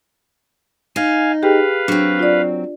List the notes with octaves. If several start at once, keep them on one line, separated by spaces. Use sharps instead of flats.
D#4 F5 G#5
G4 G#4 B4 F5 G5
F#3 C4 D4
F4 D5